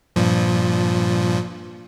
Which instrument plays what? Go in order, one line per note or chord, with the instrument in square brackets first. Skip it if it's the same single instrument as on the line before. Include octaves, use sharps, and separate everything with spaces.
[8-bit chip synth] G2 A#2 F3